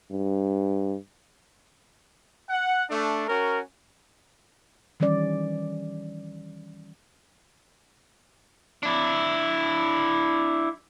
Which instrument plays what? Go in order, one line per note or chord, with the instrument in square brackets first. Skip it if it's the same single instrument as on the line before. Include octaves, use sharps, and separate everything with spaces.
[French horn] G2
[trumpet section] F#5
A3 D4
C#4 F#4 A#4
[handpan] D#3 E3 G3 C#4 D5
[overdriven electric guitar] D4 E4